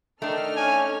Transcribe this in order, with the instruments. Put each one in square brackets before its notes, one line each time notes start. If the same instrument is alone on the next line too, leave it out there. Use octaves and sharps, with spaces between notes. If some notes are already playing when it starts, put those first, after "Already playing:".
[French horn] D#3 [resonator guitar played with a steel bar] A3 D4 [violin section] D#4 A4 F6
[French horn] C#4 [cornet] G#5